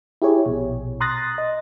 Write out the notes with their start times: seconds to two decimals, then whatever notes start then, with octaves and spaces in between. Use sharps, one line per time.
0.22 E4 G4 G#4 C#5
0.46 A#1 B2
1.00 A#5 C6 D#6 F#6 A6 A#6
1.38 D#5